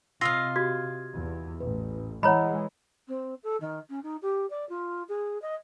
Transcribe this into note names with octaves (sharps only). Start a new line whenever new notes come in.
C3 F4 D#5 F5 E6 A#6
F#4 G4 G#6
E2
A1 B4
E3 G#3 C#5 D#5 F#5 A#5 B5
C4
A4
D#3
C#4
D#4
G4
D5
F4
G#4
D#5